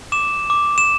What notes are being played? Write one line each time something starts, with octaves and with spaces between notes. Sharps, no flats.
D6 E7
D6
E7